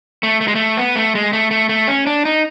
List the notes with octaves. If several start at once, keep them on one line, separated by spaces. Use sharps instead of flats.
A3
A3
G#3
A3
B3
A3
G#3
A3
A3
A3
C#4
D4
D#4